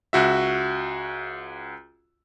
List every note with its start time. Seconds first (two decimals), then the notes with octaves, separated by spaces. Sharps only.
0.13 C#2 F#4 E5